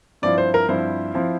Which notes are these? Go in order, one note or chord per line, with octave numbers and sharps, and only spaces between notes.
G2 F3 C4 E4 D5
C5
A#4
G2 F3 C4 E4 C5
F3 C4 E4